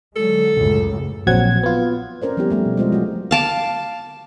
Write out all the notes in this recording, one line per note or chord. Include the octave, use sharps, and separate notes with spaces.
D3 F#3 G#3 A4
C#2 F#2 A2
A#1 F#3 C4 F#5 G#6
B3 F4
C4 C#4 A#4 C5 D5
F3 G3 B3 E4 G4
G3 A3 A#4
B2
G3 G#3 C4 F4 C5 D#5
F#3 A3 C#4 F#4
F5 A5 D6